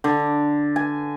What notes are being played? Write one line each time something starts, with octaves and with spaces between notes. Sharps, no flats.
D3
G#5